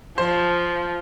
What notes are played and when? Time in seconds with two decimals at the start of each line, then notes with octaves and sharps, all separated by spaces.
0.18 F3 C5